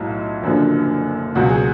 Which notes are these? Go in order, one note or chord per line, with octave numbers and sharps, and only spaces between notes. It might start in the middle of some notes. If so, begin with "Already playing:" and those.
Already playing: B1 A2 F#3 F4
F#1 F#2 D3 F3
C#2 B2 F#3 F#4
G#4